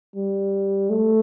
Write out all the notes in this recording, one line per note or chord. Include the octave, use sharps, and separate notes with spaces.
G3
A3